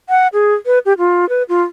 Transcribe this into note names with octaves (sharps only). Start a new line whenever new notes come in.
F#5
G#4
B4
G4
F4
B4
F4